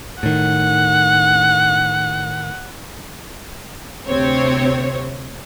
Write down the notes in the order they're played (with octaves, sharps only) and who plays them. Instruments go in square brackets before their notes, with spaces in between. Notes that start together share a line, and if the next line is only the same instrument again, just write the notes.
[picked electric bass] A2 D#3 [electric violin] F#5
[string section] D2 C3 C4 C5 C#5